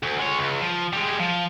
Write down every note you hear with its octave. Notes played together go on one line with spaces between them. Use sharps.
D2
G#3 C#5
C#2
F3
G3 G#3
F3